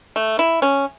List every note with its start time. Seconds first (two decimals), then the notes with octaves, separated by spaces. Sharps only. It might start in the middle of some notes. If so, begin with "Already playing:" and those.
0.16 A3
0.39 E4
0.62 C#4